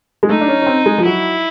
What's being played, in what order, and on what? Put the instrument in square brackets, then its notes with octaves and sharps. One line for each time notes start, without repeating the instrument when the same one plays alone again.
[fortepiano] G#3
[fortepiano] A3 [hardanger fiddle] D#4
[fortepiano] D4
C#4
C#4
C4
G#3
F3
[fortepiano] F#3 [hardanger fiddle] E4